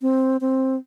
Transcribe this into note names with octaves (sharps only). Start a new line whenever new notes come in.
C4
C4